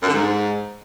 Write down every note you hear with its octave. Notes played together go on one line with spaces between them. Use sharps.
F#2
D3
G#2